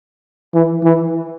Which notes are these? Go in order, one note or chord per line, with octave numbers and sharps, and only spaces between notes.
E3
E3